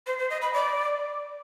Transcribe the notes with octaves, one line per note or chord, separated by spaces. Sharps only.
C5
C5
D#5
B5
D5